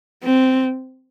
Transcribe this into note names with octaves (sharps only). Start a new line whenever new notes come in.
C4